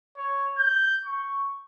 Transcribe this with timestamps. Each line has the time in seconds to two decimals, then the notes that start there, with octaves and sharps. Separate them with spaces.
0.17 C#5
0.58 G6
1.05 C#6